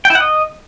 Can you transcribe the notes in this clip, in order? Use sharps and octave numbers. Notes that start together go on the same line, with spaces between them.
G5
E4
F#5
D#5